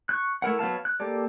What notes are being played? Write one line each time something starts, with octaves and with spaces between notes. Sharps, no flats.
C#6 F#6
A3 E4 A#4 F#5
F#3 B3 F5 A5
F#6
A#3 G4 A4 D5